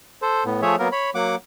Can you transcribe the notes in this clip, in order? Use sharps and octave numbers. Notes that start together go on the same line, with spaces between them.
A4 C5
A2 B3
F3 A3 G#4 C#5 E5
F#3 A#3 B3 A#4
C#5 B5
F#3 A#3 F#5 D6